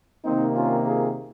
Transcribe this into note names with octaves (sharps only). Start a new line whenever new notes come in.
C3 D#3 A#3 C4 D#4
C#4 F4
F4 G#4